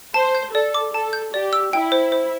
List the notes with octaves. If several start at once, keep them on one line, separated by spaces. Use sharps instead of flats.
C5 A5
G6
A4 D5
D6
A4 A5
G6
G4 D5
E6
E4 G5
C5
C5